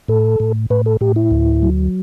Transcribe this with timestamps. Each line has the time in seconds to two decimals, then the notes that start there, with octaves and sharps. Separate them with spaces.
0.08 A2 A4
0.40 A2
0.70 A2 B4
0.86 A4
1.01 A2 G4
1.16 E4
1.31 D2
1.62 F#3